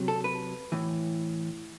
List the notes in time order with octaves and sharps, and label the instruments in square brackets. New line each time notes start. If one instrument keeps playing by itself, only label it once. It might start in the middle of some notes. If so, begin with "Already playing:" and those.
Already playing: [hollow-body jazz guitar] C3 F#3
A4
B4
A2 E3